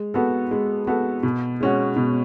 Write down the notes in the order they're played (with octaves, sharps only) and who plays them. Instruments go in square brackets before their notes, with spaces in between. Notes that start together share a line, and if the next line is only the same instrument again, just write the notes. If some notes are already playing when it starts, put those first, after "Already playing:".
Already playing: [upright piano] G#3
B3 F#4 A4
G#3
B3 F#4 A4
B2
G#3 C#4 F#4
B2